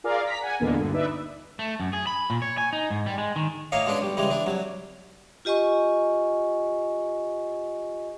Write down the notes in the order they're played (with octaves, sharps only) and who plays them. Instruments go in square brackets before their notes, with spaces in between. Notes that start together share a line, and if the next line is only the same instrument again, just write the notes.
[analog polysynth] F4 G#4 A#4 D5 F5
A#5 B6
F#5 G#5
E2 A#2 D3 G#3 A#3 B3
D2 G2 A#2 D3
D#4 B4 D5 E5
[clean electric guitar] A3
F#2
G#4
B5
A#2
C#5
G#5
D#4
G#2
G3
G#3
D#3
[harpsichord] A2 A#3 C#5 D#5 F5
B2 G#3 C#4 D4
B1 G3
C#3 E3 G3 G#3
E3 D4
C2 F#3
[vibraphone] F4 G4 D#5 G#5 C#6